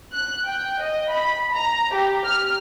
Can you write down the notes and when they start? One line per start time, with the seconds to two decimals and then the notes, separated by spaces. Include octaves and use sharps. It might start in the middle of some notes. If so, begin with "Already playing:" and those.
0.12 F#6
0.47 G5
0.82 D#5
1.12 B5
1.54 A#5
1.94 G4
2.26 F6